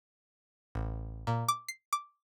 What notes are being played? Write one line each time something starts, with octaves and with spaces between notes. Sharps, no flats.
A1
A#2
D6
C7
D6